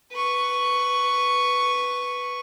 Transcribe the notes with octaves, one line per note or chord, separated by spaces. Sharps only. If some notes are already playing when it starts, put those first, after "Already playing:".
B4 C#6